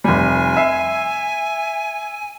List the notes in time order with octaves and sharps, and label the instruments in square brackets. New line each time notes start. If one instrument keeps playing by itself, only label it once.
[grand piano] F1 G3 [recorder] G#5
[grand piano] E5 C7